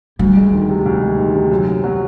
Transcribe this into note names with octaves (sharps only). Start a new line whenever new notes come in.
D2 G3
G#3
D#3
C3
D2
G#3
D#3
C3
F#2
F#2
F#3